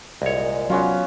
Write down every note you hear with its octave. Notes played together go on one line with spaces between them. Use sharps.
C2 A#2 G#3 C#5
F#3 B3 C#4 F4